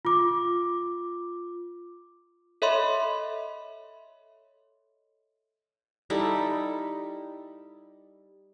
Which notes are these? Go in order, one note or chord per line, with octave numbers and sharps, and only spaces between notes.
F4 D6
A4 C#5 D#5 E5 B5 C6
G3 D#4 E4 A4